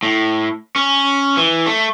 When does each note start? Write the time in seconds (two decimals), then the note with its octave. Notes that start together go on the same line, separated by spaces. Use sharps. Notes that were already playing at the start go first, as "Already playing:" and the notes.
0.03 A2
0.76 C#4
1.37 E3
1.66 A3